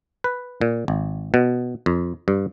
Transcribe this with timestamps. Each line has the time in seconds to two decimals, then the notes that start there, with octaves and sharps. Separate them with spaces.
0.24 B4
0.61 A#2
0.88 G#1
1.34 B2
1.86 F2
2.28 G2